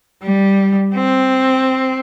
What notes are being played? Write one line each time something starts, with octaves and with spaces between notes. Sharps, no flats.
G3
C4